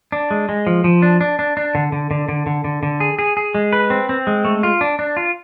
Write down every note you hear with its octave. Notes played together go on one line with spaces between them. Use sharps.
D4
G#3
G#3
F3
F3
D4
D4
D4
D4
D3
D3
D3
D3
D3
D3
D3
G#4
G#4
G#4
G#3
B4
C4
C4
G#3
A3
F4
D4
D4
F4